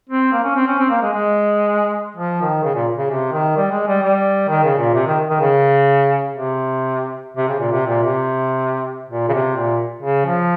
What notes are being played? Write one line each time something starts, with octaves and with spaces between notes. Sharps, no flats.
C4
A#3
C#4
C4
C#4
C4
A#3
G#3
G#3
F3
D#3
C#3
A#2
C#3
C3
D#3
G3
G#3
G3
G3
D#3
C#3
A#2
C3
D#3
D#3
C#3
C3
C3
C#3
A#2
C3
A#2
C3
A#2
C#3
C3
A#2
C#3
F3